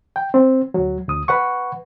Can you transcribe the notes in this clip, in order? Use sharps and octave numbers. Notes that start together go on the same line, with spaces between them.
G5
C4
D2 F#3
D2 D#6
B4 F#5 C#6